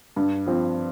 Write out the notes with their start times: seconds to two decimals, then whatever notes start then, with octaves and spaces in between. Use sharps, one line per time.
0.16 G2
0.46 F3 C4